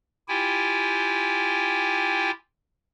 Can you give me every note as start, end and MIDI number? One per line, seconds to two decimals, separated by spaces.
0.28 2.31 64
0.28 2.31 65
0.28 2.31 67
0.28 2.31 79
0.28 2.31 80